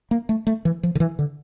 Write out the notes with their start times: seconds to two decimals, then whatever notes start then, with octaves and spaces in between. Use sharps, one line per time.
0.11 A#3
0.29 A3
0.47 A3
0.65 E3
0.83 F3
0.95 D3
1.00 E3
1.19 D3